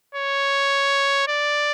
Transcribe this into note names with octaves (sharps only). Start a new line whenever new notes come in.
C#5
D5